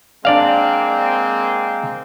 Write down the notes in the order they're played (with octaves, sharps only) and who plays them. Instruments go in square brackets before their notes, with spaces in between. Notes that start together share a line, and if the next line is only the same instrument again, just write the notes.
[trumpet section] G#3 A#3 C4 [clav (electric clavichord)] D4 D5 F5